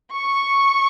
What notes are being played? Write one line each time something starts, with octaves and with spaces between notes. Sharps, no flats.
C#6